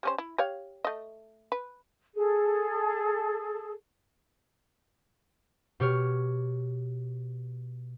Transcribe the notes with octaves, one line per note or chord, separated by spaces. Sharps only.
G3 C#4 C5
E4
G4 C#5 F5
A3 D#5
B4
G#4 A4
B2 G4 C#5 F6